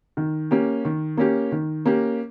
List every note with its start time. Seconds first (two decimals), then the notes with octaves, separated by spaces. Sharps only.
0.17 D#3
0.51 A#3 C#4 G4
0.85 D#3
1.17 A#3 C#4 G4
1.52 D#3
1.86 A#3 C#4 G4